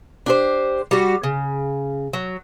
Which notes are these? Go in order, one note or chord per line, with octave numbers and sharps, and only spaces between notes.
D4 G4 C5
G3 F#4
C#3
F#3